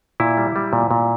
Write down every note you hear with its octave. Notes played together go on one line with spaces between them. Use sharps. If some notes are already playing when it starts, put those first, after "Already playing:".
A#2 E4
G3
G3
A#2
A#2